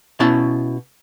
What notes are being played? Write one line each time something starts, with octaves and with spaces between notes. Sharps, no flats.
B2 C#4 E4 A5